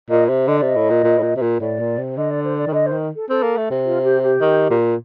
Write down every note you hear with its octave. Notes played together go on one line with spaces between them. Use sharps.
A#2 D#5
C3
D3 D#5
C3 D5
D#5
A2
A#2
A#2
A2
A#2
C3
A#2
A2 D5
A#2
C3
D3 D#5
D5
C5
D5
D#3
D3 D#5
C5
D#3
A4
C4 A4
A#3
A3
C3
F4
G4
G4
D#3
A#2